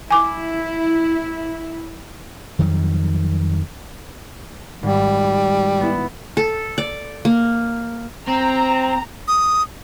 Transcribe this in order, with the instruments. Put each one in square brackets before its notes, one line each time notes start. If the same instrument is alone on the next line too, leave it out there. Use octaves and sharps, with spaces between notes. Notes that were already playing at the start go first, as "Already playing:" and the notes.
[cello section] E4 [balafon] G#5 D6
[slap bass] F2 D#3 F#3 G3
[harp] G#1 [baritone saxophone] G3
[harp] B3 E4
[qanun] A4
D5
A#3
[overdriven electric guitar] C4 [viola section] A#5
[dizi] D#6